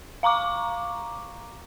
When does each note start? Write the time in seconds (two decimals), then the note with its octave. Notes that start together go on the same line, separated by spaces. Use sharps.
0.23 F5 A#5 C#6 D6